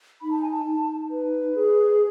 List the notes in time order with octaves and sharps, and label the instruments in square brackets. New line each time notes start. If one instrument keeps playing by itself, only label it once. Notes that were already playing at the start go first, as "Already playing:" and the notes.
[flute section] D#4 B5
A5
G#5
A5
D#4
B4
G#4